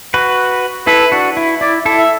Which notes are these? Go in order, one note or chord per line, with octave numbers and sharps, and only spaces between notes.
F#4 B4
E4 A4 B4
D4 F#4
E4
E4 D5
E4 A4
E5